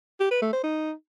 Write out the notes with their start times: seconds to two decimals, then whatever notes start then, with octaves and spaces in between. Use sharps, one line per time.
0.20 G4
0.31 B4
0.42 A3
0.53 C5
0.64 D#4